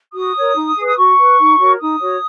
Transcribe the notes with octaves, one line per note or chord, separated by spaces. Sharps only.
F#4 D#6
A#4 C#5
D#4
G#4 B4
D#6
F#4 C#6
B4
D#4
F#4 A#4 C#5
D#4 D#6
F#4 C#5